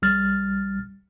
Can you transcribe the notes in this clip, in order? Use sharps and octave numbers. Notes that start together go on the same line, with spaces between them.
A#1 G3 F6 A6